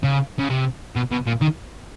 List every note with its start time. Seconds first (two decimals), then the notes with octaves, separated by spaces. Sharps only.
0.03 C#3
0.39 C#3
0.50 C3
0.96 B2
1.12 B2
1.27 A#2
1.42 D#3